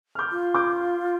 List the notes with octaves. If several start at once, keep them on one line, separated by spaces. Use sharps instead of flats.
F6
D6 G6
F4
D6 G6